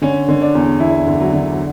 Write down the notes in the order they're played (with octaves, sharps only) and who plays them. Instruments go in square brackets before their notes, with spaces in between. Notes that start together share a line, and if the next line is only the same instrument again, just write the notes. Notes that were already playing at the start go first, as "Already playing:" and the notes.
[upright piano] D3 C#4
D3
D4
E2
E2 E4
D3
F#3
D3
F#3